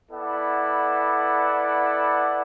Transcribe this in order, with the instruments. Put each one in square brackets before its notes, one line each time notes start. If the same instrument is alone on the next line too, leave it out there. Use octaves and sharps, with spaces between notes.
[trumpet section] B3 E4 A4 D5 F#5